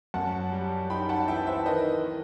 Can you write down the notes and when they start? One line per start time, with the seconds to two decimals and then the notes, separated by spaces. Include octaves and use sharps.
0.14 F#2 F#5 A5
0.52 G3
0.90 D#4 G5 B5
1.09 F#5 A5
1.28 E3 E5 G5
1.47 C5 E5
1.66 D#3 B4 D#5
2.04 D#3